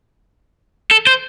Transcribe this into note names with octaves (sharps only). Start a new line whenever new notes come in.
A4
C5